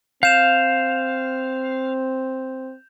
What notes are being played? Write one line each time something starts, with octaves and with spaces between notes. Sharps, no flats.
C4 F5 G6 E7 F7